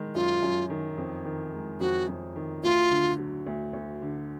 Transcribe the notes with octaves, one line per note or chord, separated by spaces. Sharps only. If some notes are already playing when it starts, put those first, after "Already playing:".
Already playing: D#3 G#3
F#2 F4
F#2
D#3
F2
D#3
G#3
F2 F#4
F2
D#3
D2 F4
D3
F#3
D2
D2
D3